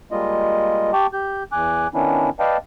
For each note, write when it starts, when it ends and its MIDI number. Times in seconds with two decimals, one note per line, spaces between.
0.11 0.91 55
0.11 0.91 56
0.11 0.91 58
0.11 0.91 65
0.11 0.91 75
0.93 1.06 67
0.93 1.06 79
0.93 1.06 81
0.93 1.06 85
0.93 1.06 86
1.13 1.43 67
1.13 1.43 91
1.52 1.87 40
1.52 1.87 80
1.52 1.87 86
1.52 1.87 90
1.94 2.30 51
1.94 2.30 59
1.94 2.30 61
1.94 2.30 62
1.94 2.30 64
2.39 2.57 71
2.39 2.57 74
2.39 2.57 75
2.39 2.57 77
2.39 2.57 79
2.39 2.57 81